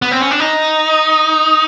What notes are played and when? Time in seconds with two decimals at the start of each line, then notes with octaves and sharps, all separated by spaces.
0.02 B3
0.11 C4
0.21 C#4
0.31 D4
0.40 D#4